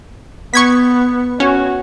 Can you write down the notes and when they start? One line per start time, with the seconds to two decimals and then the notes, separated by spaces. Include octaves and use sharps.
0.54 B3 C#6 G#6 B6
1.40 C#4 F#4